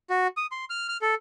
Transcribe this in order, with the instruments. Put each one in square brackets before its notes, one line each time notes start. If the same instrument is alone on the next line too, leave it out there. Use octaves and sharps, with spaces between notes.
[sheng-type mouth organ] F#4
D#6
C6
F6
F6
A4